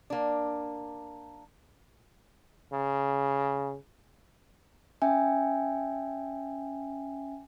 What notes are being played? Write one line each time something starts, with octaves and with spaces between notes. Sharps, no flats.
A#3 D4
C#3
C#4 E5 G5 G#5